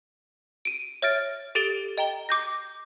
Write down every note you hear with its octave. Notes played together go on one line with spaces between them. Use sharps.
D7 D#7
C#5 E5 F6 A6 D7
G4 A4 A6 D7 E7 G7
D#5 G5 A#5 G7
D6 G6 A#6